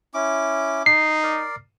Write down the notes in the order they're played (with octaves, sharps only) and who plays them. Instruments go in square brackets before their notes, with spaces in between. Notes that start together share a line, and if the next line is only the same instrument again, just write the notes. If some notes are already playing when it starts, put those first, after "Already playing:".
[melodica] C#4 E4 D6
[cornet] D#4 [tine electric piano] C7
[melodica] A#4 D5